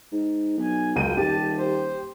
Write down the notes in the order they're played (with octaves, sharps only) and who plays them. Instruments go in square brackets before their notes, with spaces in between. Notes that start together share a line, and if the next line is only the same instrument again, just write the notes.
[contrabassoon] G#2
[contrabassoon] B1 [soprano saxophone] G#5
[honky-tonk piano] C#2 D#7 [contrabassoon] F#2 [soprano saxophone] G5
[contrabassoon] D#1 [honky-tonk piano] G4 [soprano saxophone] A5
[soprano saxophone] C5